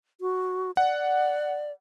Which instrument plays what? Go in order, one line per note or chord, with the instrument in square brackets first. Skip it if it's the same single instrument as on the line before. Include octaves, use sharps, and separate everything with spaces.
[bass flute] F#4
[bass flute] D5 [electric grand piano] F#5